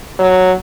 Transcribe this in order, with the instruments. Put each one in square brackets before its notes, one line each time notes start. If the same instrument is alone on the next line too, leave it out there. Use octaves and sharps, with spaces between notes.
[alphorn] F#3